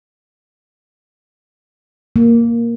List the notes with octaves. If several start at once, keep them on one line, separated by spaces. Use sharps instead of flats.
A#3